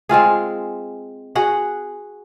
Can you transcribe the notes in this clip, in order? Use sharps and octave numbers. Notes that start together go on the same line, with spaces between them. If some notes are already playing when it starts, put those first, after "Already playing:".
G#3 C4 F4 G#4
F#4 G#4 F#5